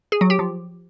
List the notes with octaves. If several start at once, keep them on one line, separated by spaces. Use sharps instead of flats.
G#4
F#3
G4
F3